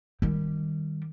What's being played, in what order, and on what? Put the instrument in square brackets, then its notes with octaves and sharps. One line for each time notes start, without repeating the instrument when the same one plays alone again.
[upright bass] D#3 G3